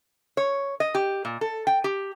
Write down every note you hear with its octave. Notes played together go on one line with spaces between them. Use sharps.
C#5
D#5
G4
A#2
A4
G5
G4